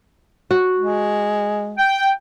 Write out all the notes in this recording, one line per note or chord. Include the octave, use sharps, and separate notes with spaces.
F#4
G#3
G5